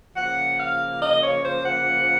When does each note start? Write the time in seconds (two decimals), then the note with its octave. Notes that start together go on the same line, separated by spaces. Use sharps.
0.14 C#3 F3 A#3 F#5
0.58 F5
0.99 D#5
1.21 C#5
1.43 C5
1.64 F#5